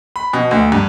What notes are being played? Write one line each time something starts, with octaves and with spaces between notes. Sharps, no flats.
B5
B2
D2
G2